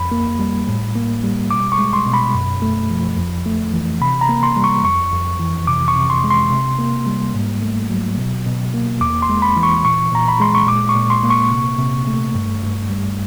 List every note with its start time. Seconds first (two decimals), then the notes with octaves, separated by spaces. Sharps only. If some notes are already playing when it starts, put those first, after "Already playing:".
Already playing: F2 B5
0.12 A#3
0.40 G3
0.68 A2
0.95 A#3
1.24 G3
1.51 B2 D6
1.72 C#6
1.78 G#3
1.93 C6
2.06 B2
2.13 B5
2.35 F#2
2.62 A3
2.90 F3
3.18 F2
3.46 A3
3.73 E3
4.01 C3 B5
4.21 A#5
4.29 A#3
4.43 C6
4.56 G3
4.64 C#6
4.84 F2 C#6
5.13 F2
5.40 E3
5.67 C3 D6
5.88 C#6
5.96 C3
6.10 C6
6.24 G#3
6.30 C6
6.51 C3
6.79 A#3
7.07 G3
7.34 G#2
7.63 A3
7.90 F#3
8.18 B2
8.46 B2
8.74 A#3
9.01 E2 D6
9.22 C6
9.29 G#3
9.42 B5
9.57 E3
9.63 C#6
9.84 A#2 C#6
10.12 A#2 A#5
10.28 B5
10.40 G#3 C6
10.55 C#6
10.67 A#2 D6
10.89 C#6
10.95 A#2
11.10 C6
11.23 A#3
11.30 C#6
11.51 C3
11.79 C3
12.07 A3
12.35 G2
12.63 G2
12.90 G3